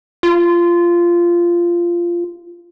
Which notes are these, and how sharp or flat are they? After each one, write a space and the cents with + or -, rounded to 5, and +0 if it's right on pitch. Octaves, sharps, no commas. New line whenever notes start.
F4 -15